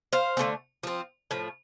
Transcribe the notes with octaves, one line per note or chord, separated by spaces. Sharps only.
C5 F5
D3 A3 C4
F3 C4
A2 F3